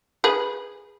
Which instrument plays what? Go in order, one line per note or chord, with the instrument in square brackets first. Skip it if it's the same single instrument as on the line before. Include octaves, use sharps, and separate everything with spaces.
[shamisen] G#4 B4